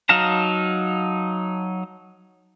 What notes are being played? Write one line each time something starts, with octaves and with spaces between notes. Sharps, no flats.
F#3 D#4 F5 A5 A#5